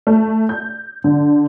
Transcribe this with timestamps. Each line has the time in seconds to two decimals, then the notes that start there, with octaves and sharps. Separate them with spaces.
0.07 A3
0.49 G6
1.04 D3